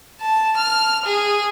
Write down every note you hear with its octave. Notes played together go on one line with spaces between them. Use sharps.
A5
F6
G#4